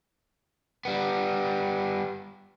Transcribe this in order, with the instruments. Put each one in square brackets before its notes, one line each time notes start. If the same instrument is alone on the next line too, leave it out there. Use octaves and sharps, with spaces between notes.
[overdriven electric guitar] G3 B3